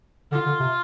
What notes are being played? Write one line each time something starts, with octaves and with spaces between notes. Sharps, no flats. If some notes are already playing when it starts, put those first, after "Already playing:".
D3 F4
D3
C3